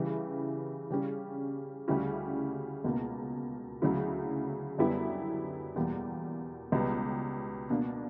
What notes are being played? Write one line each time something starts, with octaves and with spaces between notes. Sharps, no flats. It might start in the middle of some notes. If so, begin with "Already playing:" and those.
Already playing: C#3 E3 G3 C#4 E4
C#3 G3 C#4
D2 C#3 G3 C#4 E4
C#2 B2 A#3
D2 C#3 F#3 C#4 E4
F#2 D3 G3 B3 E4
E2 B2 G3 A#3
C#2 B2 G3 B3
B2 A#3 D4